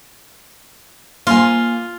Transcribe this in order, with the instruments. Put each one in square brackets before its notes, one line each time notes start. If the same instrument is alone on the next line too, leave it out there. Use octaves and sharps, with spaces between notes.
[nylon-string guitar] A#3 G#5 [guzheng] F4